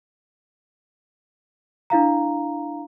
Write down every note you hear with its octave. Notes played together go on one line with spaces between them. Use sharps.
D4 E4 F5 A#5